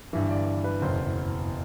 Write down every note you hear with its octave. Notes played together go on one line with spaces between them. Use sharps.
G1 G2 E3 E5
D5
D5
B4
F#1 E2 B2 C5